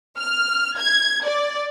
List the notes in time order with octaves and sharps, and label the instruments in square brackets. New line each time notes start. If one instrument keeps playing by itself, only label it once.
[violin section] F6
G#6
D5